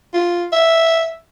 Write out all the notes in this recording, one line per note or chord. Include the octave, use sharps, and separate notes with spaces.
F4
E5